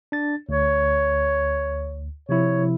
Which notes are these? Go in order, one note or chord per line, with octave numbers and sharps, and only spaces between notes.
D4 A6
D2 C#5
C3 F3 E4 C#5